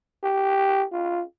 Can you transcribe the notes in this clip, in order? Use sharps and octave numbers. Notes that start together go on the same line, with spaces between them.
G4
F4